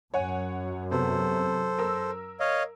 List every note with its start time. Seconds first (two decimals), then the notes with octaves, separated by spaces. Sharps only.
0.14 F#2 C#5 F#5 G#5
0.91 C3 B3 A4 C5
1.78 A#4 E6
2.40 C#5 D#5 F5